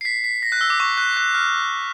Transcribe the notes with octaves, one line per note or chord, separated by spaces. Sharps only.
C7
B6
B6
A#6
F#6
E6
D6
C#6
F#6
F#6
F6